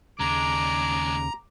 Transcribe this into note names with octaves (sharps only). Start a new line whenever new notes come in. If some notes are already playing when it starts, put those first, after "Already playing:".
D#2 C#3 G#3 D4 A#5 D6